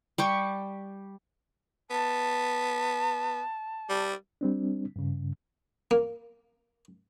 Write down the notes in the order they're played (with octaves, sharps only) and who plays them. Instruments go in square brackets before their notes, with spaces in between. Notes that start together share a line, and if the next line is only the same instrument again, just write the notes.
[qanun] G3 G4 C#6
[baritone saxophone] B3 [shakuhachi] A5
[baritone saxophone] G3
[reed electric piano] G3 C4 D4
G2 C#3
[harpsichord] A#3